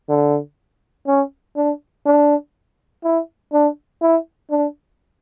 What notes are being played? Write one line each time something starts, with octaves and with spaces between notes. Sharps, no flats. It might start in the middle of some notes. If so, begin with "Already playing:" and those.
D3
C#4
D4
D4
E4
D4
E4
D4